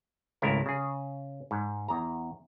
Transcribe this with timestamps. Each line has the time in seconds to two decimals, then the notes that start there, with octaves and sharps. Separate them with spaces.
0.42 G#1 C#2 C#3 A3 E4 A#4
0.66 C#3 G#4
1.51 G#2
1.88 E2 A#5